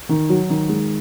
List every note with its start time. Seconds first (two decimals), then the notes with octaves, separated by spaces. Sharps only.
0.09 D#3
0.30 F#3
0.50 D#3
0.69 G#3